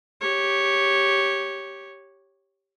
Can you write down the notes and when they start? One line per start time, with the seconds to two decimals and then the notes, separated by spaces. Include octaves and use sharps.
0.21 G4 C#5